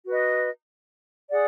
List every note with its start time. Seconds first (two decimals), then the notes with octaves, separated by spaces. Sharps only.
0.05 F#4 B4 D#5
1.30 G#4 D5 F#5